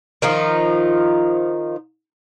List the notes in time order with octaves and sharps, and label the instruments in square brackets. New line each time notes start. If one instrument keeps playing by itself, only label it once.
[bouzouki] D#3 F3 D#4 F4